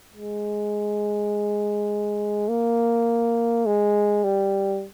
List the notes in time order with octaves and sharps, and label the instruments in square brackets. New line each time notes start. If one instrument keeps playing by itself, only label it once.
[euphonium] G#3
A#3
G#3
G3